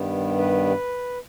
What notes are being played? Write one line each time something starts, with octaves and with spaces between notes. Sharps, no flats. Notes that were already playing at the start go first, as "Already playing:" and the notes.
Already playing: G2 D#3 G3 B3
B4